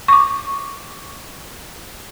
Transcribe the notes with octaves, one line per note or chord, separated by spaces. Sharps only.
C#6 D6